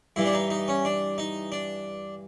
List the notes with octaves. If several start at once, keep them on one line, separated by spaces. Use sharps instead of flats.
G2 E3 E4
D4
D#4
D#4
C#4
D4
D#4
D4